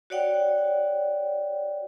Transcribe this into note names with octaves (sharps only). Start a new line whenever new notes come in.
F#4 C#5 D5 F#5 G5